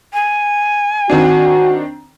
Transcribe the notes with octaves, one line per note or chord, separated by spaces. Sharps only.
G#5
D#3 C4 D4 F#4